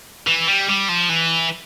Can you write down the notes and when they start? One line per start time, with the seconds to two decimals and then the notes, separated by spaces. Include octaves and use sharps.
0.27 E3
0.47 G3
0.69 G3
0.89 F3
1.10 E3